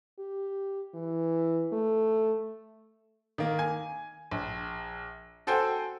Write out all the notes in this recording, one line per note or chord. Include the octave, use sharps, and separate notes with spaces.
G4
E3
A3
D#3 A#3
G#5
A#1
F#4 A4 C5 G5 G#5